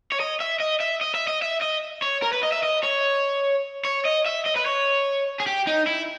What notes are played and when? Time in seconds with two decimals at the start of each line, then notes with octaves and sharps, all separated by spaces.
0.12 C#5
0.20 D#5
0.40 E5
0.60 D#5
0.80 E5
1.01 D#5
1.14 E5
1.28 D#5
1.42 E5
1.62 D#5
2.02 C#5
2.22 A#4
2.33 B4
2.43 D#5
2.52 E5
2.63 D#5
2.84 C#5
3.85 C#5
4.05 D#5
4.26 E5
4.45 D#5
4.56 B4
4.66 C#5
5.40 G#4
5.47 G4
5.67 D#4
5.87 E4